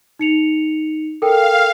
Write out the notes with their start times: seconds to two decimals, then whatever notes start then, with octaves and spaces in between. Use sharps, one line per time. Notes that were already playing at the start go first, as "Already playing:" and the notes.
0.19 D#4 C#7 F7
1.22 A4 A#4 F5 G5